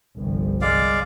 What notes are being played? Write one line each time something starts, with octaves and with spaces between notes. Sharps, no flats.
G1 C2 F3
G#3 D5 F5